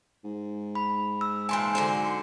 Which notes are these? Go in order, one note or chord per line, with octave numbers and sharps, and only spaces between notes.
G#2
B5
E6
A#2 E3 G#5 A5 C6
D3 F#3 C5